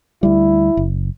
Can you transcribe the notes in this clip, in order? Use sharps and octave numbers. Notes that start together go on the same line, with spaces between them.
D2 G3 E4
F#1